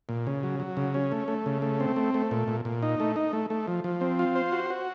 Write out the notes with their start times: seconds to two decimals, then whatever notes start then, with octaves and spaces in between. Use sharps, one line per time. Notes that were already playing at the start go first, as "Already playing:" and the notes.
0.09 A#2
0.27 C#3
0.43 F#3
0.60 F#3
0.77 C#3
0.94 C#4
1.12 A3
1.28 A3
1.46 C#3
1.62 A3
1.80 C4
1.96 A3
2.14 A3
2.31 A#2
2.48 A#2
2.65 A#2
2.83 D#4
3.00 A3
3.16 D#4
3.33 A3
3.50 A3
3.68 F3
3.84 F3
4.01 C4
4.19 F4
4.35 C5
4.52 F#4
4.70 F#4